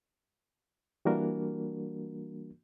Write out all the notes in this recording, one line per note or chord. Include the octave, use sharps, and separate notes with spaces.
E3 G3 A#3 D4 F#4 A#4